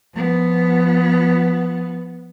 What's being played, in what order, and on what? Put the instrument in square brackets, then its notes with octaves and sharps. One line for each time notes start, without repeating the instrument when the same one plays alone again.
[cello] F3 B3